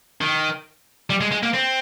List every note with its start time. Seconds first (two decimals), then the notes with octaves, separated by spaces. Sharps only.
0.21 D#3
1.10 G3
1.21 G#3
1.32 G#3
1.43 A#3
1.54 C4